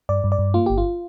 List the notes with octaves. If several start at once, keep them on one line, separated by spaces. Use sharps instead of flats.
G2 D5
G2
D5
G2
A#3 F4
G1 G4
F4